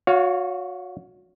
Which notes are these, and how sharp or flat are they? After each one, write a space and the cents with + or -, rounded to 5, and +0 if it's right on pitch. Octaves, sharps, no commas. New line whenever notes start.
F#4 -25 C#5 +20 F5 +0